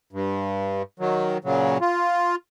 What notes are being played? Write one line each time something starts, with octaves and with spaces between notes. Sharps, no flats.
G2
D#3 F#3
A#2 C#3 F#3
F4